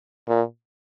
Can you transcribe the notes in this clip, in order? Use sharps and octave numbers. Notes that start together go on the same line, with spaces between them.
A#2